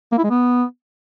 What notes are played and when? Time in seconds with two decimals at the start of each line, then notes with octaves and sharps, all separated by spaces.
0.12 A#3
0.18 E4
0.24 G#3
0.30 B3